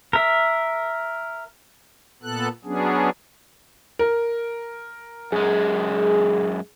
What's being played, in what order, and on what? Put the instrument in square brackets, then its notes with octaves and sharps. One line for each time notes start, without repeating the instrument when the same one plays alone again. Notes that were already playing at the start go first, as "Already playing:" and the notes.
[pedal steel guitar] A#4 E5
[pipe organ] A#2 B3 A4 F#6
F#3 B3 C#4 D4 G#4
[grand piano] A#4
[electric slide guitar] F#2 G#3 [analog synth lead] G#4